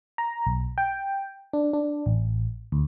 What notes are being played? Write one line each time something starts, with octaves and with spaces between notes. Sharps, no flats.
A#5
B1
G5
D4
D4
A1
D2